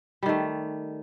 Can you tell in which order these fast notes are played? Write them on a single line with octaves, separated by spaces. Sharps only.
G3 D#3 A3